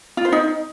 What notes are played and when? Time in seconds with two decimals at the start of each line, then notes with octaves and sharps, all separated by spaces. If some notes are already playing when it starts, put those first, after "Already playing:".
0.17 F4
0.25 C5
0.32 D#4